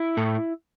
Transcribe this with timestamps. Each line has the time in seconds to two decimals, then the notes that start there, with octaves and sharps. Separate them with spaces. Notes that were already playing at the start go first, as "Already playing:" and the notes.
Already playing: E4
0.17 A2